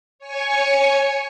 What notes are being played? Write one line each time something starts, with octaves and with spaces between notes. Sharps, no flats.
C#5 G#5 C#6